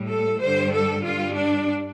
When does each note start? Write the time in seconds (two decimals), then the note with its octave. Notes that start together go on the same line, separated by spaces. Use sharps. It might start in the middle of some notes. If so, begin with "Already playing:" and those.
Already playing: A2 G3
0.08 A4
0.40 G2 D3 G3 C5
0.72 A4
1.04 G2 G3 F4
1.36 D4